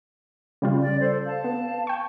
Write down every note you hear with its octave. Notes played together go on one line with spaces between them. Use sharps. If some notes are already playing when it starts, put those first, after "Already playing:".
C#3 G3 F4
D5
A4 C5
F5 A5
B3
G5 C#6